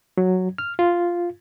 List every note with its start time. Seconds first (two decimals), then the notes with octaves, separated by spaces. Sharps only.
0.17 F#3
0.58 F6
0.79 F4